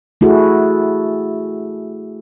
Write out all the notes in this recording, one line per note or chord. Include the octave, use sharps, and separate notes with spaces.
A3 E4 F#4 G#4 A4